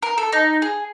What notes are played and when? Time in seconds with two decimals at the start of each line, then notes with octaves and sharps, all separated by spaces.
0.02 A#4
0.18 A4
0.32 D#4
0.62 G#4